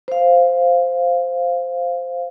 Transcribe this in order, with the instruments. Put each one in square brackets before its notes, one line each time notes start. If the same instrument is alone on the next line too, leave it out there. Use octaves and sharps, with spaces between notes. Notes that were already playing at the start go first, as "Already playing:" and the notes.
[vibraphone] C5 F5